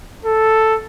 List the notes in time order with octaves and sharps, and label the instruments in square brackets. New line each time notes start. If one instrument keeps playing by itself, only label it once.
[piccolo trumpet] A4